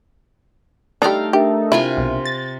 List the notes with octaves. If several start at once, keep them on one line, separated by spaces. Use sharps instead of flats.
G3 A3 D4 D#4 A4 F5 G5 A#5
D4 G4 A#4 E5
C3 E4 F4 G#5
B1
A6 A#6